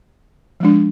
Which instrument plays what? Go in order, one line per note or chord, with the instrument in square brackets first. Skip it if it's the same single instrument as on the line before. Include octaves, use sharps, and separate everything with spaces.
[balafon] F3 G#3 D4